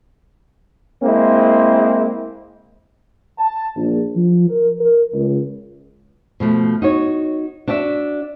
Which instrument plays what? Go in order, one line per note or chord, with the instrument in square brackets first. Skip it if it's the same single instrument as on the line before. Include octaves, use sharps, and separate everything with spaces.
[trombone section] G#3 A#3 C4 E4
[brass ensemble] A5
A#1
F3
A#4
A#4
C#2
[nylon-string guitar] B2 F3 A3
D#4 F#4 C#5
D4 F#4 D5 E5